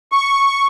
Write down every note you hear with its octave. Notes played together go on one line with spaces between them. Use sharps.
C#6